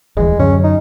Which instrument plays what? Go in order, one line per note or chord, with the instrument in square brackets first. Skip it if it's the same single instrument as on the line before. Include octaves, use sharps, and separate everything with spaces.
[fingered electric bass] D#1 D2 E3 [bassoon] G#3
[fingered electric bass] F#2 D3 F#3 [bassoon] C#4
[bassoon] D#4